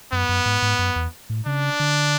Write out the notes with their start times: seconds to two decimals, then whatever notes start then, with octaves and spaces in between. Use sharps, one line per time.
0.12 F#2 B3
0.29 F#2
0.46 G#2
0.62 G#2
0.79 F#2
0.96 E2
1.30 A2
1.46 C#3 D4
1.80 D3